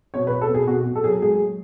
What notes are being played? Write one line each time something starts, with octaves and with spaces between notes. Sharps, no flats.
B2 C#5
B4
B2
A4
B2 G#4
B2 F#4
B2
A4
F#3 G#4
G#3 G#4
G#3